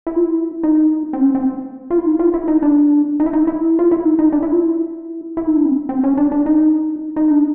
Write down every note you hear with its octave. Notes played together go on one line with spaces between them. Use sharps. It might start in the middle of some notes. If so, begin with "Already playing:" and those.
E4
F4
E4
D#4
C4
C#4
C4
F4
E4
D#4
F4
E4
D#4
D4
D#4
E4
D#4
E4
F4
E4
D#4
D#4
D4
E4
F4
E4
E4
D#4
D4
C4
C4
C#4
D4
D4
D#4
D#4
D4